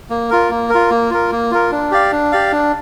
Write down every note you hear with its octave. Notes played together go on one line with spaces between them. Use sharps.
A#3
F4 A#4
A#3
F4 A#4
A#3
F4 A#4
A#3
F4 A#4
D4
G4 D5 F5
D4
G4 D5 F5
D4